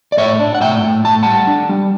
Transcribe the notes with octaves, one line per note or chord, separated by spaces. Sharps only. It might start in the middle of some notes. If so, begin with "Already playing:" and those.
D5
A2 C#5 E5
D4
F#5
A2 E5 G5
A2
A2 A5
G3 F#5 A5
D4
G3